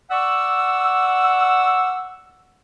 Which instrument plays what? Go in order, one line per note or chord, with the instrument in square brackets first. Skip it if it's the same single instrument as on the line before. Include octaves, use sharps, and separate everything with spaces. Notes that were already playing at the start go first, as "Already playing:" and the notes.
[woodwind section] D5 F#5 C#6 E6